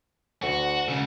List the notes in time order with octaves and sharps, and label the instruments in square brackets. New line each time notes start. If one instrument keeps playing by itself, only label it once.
[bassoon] D2 [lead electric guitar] F#4
[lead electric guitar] C#2 C#3